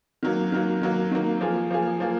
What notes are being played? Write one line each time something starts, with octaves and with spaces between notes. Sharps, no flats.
D#3 F#3 A#3
D#3 F#3 A#3
D#3 F#3 A#3
D#3 F#3 A#3
F3 A#3 F4 G#4
F3 A#3 F4 G#4
F3 A#3 F4 G#4